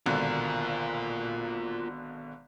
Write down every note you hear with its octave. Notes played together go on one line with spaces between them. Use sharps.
G#1 B2 D3 F4 A#4